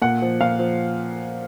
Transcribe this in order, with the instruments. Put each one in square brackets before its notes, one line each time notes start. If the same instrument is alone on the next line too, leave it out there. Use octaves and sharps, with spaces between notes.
[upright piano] A#2 F#5
F3
A#2 F5
F3